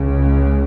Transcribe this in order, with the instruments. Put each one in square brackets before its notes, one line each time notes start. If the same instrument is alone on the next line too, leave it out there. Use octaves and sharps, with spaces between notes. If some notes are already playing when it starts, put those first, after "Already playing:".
Already playing: [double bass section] C#2 C#3
G#3